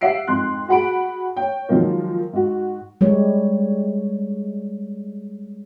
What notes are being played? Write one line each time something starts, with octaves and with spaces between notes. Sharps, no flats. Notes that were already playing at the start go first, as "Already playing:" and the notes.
G4 E5 F#5 C7 D7
F2 G#2 C6 F#6
F#4 G#4 F#5 B5 D7
C#5 G5
D#3 F3 F#3 G#3 A#3
G#2 F#4
G3 G#3 C#5